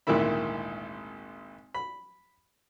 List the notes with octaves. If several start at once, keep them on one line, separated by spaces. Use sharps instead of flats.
G#1 D2 A#2 D#3 E4 B5
B5